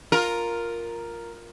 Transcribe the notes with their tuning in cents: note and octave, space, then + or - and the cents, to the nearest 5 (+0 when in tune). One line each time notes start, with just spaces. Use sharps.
F4 +5 A#4 +0